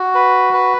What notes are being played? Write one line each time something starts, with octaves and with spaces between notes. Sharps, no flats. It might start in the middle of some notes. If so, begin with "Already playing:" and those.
Already playing: F#4
B4
B4